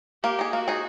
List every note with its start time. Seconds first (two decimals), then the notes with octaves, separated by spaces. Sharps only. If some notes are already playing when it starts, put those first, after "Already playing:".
0.24 A#3 G4
0.39 D#4 G#4
0.53 A#3 F#4
0.68 D#4 G#4